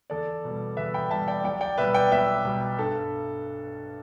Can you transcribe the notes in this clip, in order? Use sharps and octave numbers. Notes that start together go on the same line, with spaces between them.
E2 A4 D5
B2 G3
E2 B4 E5
G5 B5
B2 G3 E5 A5
D5 G5
B1 D5 G5
D5 G5
B2 G3 B3 B4 E5
D5 G5
B1 B4 E5
B2 G3 B3
G2 A4